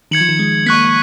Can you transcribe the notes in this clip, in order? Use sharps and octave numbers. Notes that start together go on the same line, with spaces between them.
D#3 G#6 C#7 F#7
F3
D#3
G#3
A#3 C#6 F#6 B6